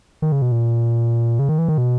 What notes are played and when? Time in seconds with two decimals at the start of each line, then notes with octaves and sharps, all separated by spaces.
0.22 D#3
0.32 C#3
0.42 B2
0.52 A#2
1.39 C#3
1.49 D#3
1.58 E3
1.68 D#3
1.78 B2